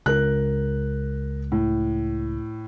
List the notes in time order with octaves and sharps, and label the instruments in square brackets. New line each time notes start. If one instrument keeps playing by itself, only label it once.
[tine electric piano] C#2 [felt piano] A#4 F#6
[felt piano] A2